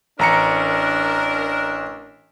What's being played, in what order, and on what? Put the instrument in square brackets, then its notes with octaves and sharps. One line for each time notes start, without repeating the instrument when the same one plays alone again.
[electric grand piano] A1 A#5 C#7 [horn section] D4 A#4